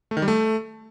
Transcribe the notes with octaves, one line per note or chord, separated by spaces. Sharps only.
A3
D#3
G3
A3